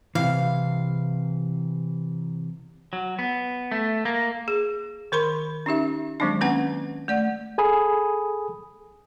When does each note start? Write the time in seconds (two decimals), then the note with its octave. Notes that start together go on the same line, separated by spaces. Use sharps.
0.15 C3 E3 F5
2.93 F#3
3.19 B3
3.72 A3
4.05 A#3
4.48 G#4
5.12 D#3 A#4 B5 C6
5.66 C#4 D#4 G4 E5
6.20 D#3 F#3 G#3 C4 D4
6.41 A#3 C4 C#4 B4 F#5
7.08 A3 D5 F#5
7.58 G#4 A4 G#5 B5 D#6